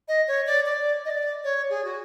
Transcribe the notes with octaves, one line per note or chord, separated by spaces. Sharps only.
D#5
C#5
D5
D5
D#5
D5
C#5
G#4
F#4